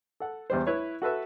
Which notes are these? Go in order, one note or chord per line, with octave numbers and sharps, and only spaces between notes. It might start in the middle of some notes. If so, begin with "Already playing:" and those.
A4 F#5
E2 G3 C5
E4 B4 C#5
F#4 A4 B4 E5